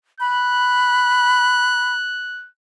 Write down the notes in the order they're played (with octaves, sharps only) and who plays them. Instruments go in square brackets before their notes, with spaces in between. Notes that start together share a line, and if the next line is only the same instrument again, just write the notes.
[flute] B5 [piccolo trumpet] F#6